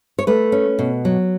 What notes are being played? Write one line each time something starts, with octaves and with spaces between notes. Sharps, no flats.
C#5
A3 B4
C#4
B2
F#3